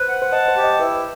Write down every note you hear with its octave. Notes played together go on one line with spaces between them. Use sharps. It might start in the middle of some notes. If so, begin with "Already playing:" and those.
Already playing: B4 C5
F#5
C5
D#5 A5
C5
G4
D#5
E4 B4